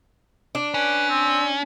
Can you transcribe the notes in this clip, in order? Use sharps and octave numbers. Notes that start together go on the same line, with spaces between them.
D4
C#4 B4
C4